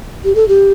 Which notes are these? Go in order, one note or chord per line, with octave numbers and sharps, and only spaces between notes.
G4
A4
G4